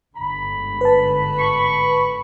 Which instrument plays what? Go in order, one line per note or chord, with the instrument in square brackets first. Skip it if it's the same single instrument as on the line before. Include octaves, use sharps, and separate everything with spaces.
[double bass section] G1 G#2 D3 [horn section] B5
[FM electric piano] B4 A5
[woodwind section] C#6